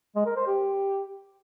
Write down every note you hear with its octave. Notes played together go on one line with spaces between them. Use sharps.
G#3
A#4
C5
G4